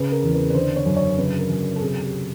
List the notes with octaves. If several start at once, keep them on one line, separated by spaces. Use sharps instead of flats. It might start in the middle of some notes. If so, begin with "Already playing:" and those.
Already playing: C#3 B4
A#4
E2
B4
B4
D3 C5
C#5
F#2
C#5
C#3 B4
A#4
F#2
A4
C3 G#4
G4